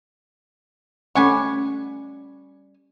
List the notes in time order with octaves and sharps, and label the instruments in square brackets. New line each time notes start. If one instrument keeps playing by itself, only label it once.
[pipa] G3 G#5 C#6 [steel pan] A3 C#4 F#5